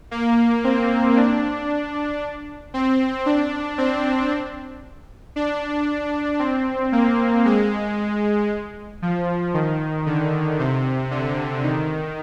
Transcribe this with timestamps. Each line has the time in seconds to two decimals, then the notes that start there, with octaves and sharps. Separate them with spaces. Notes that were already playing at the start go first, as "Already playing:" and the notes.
0.11 A#3
0.64 C4
1.17 D4
2.74 C4
3.26 D4
3.78 C4
5.36 D4
6.39 C4
6.92 A#3
7.45 G#3
9.02 F3
9.54 D#3
10.06 D3
10.59 C3
11.11 D3
11.63 D#3